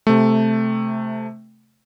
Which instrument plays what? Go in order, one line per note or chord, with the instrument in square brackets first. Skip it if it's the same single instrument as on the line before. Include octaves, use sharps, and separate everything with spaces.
[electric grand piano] C3 A3